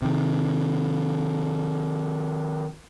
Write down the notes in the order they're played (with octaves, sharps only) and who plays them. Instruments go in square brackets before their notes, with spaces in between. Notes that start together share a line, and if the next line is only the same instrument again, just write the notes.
[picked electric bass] C3 D#3